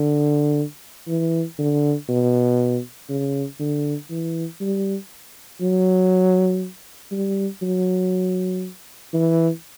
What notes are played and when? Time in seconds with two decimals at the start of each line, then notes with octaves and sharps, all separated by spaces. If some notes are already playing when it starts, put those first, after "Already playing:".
Already playing: D3
1.08 E3
1.58 D3
2.09 B2
3.09 C#3
3.59 D3
4.10 E3
4.60 G3
5.61 F#3
7.12 G3
7.62 F#3
9.13 E3